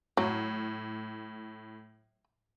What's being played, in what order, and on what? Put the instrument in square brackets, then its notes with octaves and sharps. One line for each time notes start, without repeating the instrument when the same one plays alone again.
[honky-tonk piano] A2 [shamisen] F#3